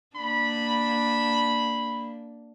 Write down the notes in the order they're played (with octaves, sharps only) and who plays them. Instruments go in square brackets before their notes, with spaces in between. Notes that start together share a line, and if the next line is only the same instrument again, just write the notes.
[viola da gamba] A#3 D4 [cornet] B5